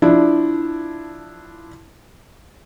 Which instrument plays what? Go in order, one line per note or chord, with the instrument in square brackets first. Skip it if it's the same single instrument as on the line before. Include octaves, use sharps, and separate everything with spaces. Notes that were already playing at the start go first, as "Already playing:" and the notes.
[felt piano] F3 D4 E4